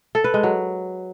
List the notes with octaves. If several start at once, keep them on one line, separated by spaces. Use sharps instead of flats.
A4
B4
G#3
F#3